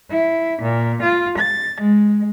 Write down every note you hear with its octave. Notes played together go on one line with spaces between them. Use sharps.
E4
A#2
F4
A6
G#3